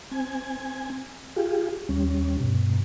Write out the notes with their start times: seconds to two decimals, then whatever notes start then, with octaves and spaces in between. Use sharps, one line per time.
0.11 C4 G#5
1.36 F4 G4 G#4
1.89 D#2 G3 C#4
2.40 G2 B2